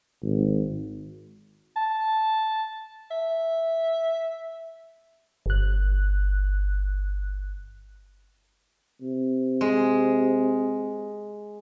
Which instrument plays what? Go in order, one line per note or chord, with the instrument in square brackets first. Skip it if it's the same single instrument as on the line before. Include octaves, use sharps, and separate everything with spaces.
[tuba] G#1
[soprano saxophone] A5
E5
[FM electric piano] G1 F#6
[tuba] C3
[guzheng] G#3